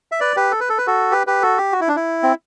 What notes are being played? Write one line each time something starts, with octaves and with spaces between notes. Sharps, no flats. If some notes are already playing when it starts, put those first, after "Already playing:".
E5
B4 D5
G4 B4
A4
B4
A4
B4
F#4 A4
G4 B4
G4 B4
F#4 A4
G4
F#4
E4
D4
E4
C4